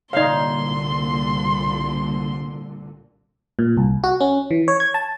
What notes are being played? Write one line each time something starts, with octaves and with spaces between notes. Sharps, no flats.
C2 A#2 D3 D#4 C#5 D5 F5 C6
A#2
C2
F#4
C#4
E3
C#5
G#6
A5